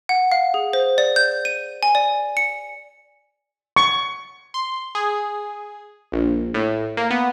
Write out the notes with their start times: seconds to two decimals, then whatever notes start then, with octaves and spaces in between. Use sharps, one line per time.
0.09 F#5
0.32 F5
0.54 G#4
0.73 C5
0.98 D5
1.16 G6
1.45 D#7
1.83 G#5
1.95 D5
2.37 C#7
3.76 C#6
4.54 C6
4.95 G#4
6.12 A#1
6.54 A2
6.97 A#3
7.11 B3